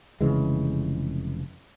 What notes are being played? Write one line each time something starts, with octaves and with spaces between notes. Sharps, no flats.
F1 C#3 E3 G#3